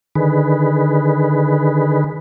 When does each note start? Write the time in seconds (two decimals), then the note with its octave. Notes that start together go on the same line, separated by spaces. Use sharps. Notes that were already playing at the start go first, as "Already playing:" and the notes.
0.16 D3 D#3 G#4 B4